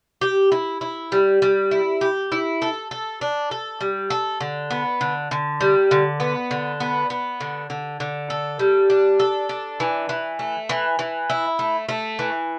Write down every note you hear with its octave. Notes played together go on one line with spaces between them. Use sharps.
G4
E4
E4
G3
G3
E4
G4
E4
A4
A4
D4
A4
G3
A4
D3
B3
D3
D3
G3
D3
B3
D3
B3
B3
D3
D3
D3
A4
G3
D4
A4
D4
E3
E3
A3
E3
E3
E4
A3
A3
E3